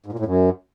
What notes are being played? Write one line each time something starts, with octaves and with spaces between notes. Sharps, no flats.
G#2
A#2
A2
F#2